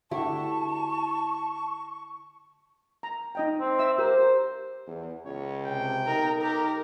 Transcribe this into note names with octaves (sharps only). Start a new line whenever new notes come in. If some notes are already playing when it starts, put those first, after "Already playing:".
D3 E4 F#4 G4 A5 C#6
A#5
D#4 D#5 G5
C4
E5 E6
G4 A#4 C5
E2
C#2 C#5
C3 G5
B1 D#4 A#4
G4 A#4